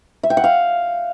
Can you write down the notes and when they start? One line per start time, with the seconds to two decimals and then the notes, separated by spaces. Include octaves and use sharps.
0.23 E5
0.30 G5
0.37 F#5
0.44 F5